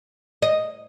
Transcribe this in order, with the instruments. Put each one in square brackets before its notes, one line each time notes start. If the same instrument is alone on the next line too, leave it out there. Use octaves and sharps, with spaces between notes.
[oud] D#5